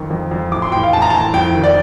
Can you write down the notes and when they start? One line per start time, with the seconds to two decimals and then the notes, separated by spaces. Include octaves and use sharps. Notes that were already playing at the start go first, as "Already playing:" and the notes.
Already playing: F2 D#3
0.10 F2
0.31 F2
0.52 A2 D6
0.62 C6
0.72 A2 G5
0.83 F5
0.93 A2 A5
1.02 A#5
1.10 A2 A5
1.34 F2 G5
1.55 D#3
1.64 D5